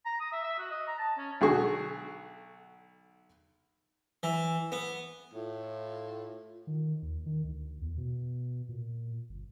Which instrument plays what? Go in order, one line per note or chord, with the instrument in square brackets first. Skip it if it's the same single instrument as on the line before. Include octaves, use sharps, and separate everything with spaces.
[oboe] A#5
D#6
E5
E5
F#4
D#5
A#5
A5
C#4
[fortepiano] B1 D3 F#4 G#4 C#6
[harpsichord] E3
B3
[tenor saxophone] A2 [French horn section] F4
[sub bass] D#3
D#2
D#3
D2
E2
B2
A#2
G1